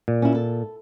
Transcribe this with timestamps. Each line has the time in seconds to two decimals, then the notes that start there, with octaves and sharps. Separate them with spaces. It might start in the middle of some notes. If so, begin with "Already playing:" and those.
0.08 A#2
0.22 C#4 E4
0.35 A4